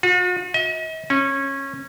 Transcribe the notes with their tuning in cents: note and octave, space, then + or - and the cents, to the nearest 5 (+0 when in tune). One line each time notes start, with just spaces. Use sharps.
F#4 -45
D#5 +45
C#4 -20